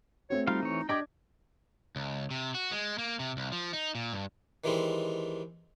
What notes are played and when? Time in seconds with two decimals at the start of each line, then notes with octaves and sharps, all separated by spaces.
0.30 A3 C4 F#4 C#5
0.47 G3 D#4 F4 F5
0.63 E3 C#5
0.89 D4 G4 D5 D#5 G5 D6 G#6
1.96 C#2
2.31 C3
2.54 F#4
2.72 G#3
2.98 A#3
3.19 C3
3.37 C2
3.52 F3
3.73 D#4
3.95 A#2
4.13 G2
4.64 D#3 E3 G3 G#3 C4